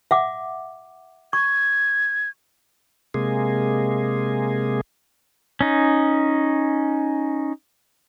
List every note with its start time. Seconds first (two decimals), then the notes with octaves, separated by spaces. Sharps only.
0.11 E5 F#5 D6
1.33 C#6 G#6
3.14 C3 G#3 A#3 G#4
5.61 C#4 D#4